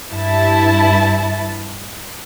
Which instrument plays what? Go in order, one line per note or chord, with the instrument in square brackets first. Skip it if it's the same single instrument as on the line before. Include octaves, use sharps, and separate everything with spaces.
[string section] G2 E4 A5